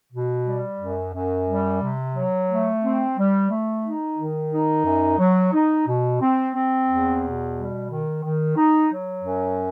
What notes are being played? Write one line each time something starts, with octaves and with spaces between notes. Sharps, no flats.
B2
G3
F#2
F#2
G3
C3
F#3
A3
C4
G3
A3
D#4
D#3
D#4
F#2
F#3
D#4
B2
C4
C4
E2
B2
G3
D#3
D#3
D#4
F#3
F#2